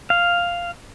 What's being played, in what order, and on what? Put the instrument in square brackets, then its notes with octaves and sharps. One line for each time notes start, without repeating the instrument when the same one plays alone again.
[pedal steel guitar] F5